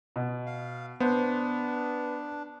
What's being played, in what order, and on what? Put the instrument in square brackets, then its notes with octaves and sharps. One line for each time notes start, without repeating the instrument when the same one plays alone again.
[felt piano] B2
[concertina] F5
[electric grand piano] B3 [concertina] D4 [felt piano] C5